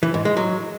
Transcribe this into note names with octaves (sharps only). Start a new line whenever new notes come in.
E3
G#2
G#3
F#3